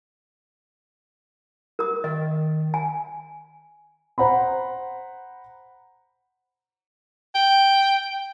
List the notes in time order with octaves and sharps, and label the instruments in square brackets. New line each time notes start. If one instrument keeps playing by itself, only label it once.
[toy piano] A#4 D#6
[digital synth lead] D#3 [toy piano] D#5
[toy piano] G#5
[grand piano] C5 F#5 A#5 B5
[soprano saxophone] G5